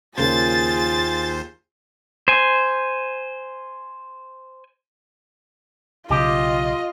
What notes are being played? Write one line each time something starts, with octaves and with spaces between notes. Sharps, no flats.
D#2 C#3 A#3 C#4 F4 G#4 C5 A6
C5 G#5
B1 C#3 F4 G4 D#5